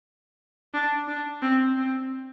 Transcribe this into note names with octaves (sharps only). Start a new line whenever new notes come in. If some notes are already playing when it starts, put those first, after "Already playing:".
D4
D4
C4
C4